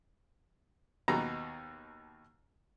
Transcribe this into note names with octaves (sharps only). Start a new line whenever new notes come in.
D#2 B2 D#4 A#5